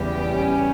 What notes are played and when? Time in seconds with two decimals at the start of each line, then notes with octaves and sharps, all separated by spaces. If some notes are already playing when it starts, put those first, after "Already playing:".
Already playing: E2 C#3 G3 B3 G4
0.30 C#4